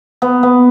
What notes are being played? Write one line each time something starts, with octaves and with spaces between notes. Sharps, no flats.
B3
B3